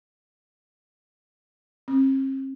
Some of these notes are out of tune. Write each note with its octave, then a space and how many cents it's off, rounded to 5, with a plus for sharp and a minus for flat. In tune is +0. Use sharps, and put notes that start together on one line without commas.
C4 +40